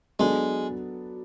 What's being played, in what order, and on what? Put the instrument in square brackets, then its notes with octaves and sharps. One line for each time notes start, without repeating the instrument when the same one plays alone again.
[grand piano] F#3 B3 D4 A4 [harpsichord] G#3